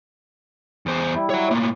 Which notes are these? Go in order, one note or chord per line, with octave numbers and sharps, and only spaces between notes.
E2 C5
G3 E4
C#5 F#5
A2 A#3